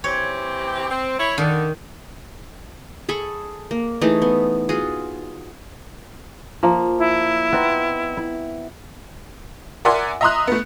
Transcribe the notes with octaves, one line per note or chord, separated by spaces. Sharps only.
E3 C4 G4 C#5
C4
E4 C#5
D3 D#3
G#4 A4 B5 C#6
A#3
E3 A3 D#4 G#4
B3
F4 F#4 G#4
F3 A#3
E4
B3 C4 D#4
E4
A#4 D5 E5 F#5 G#5 C6
D#5 E5 A#5 C6 D#6 F#6
A3 B3